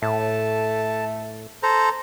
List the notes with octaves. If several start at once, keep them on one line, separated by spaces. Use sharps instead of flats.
A2 A3 A5
A4 C5 A#5